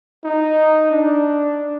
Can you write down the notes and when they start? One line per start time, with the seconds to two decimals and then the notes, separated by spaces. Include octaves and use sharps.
0.24 D#4
0.91 D4